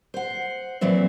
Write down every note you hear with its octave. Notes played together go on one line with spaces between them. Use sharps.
C5 F#5
A#2 E3 F#3 C4 E5